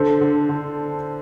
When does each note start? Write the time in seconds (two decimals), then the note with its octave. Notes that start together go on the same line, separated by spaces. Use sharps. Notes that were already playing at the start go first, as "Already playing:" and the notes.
Already playing: D3 A4 C5
0.21 D3
0.49 D3